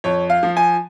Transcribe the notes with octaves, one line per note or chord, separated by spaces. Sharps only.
F2 C#5
F5
F3
G#5